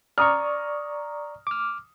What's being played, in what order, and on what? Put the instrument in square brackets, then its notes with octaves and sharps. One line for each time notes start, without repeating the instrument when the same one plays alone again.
[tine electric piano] D5 C#6 [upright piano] A#5 D#6 F6
[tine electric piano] D6 F6